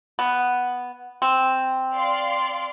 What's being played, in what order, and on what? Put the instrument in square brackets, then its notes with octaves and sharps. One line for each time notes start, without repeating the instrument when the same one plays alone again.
[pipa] B3
C4
[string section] D5 F5 C6